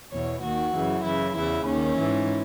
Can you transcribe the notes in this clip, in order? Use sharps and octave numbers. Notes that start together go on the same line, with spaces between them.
E2 B2 C#5
D#2 D#3 F#4
F#2 C#3 E3
F#2 C#3 E3 E4
E2 C#3 E3 E4
D#2 D#3 C#4
G#2 E3